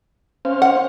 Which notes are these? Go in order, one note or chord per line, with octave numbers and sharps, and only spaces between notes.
C#4 C5 F5
F#5